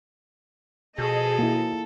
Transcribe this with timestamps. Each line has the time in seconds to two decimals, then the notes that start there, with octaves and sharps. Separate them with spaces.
0.98 B2 F3 G#4 A4 D#5
1.39 A#3 E4